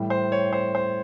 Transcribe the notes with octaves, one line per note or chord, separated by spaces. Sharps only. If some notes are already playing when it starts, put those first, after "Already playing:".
Already playing: A2 E3 G3
C5
C#5
C5
C5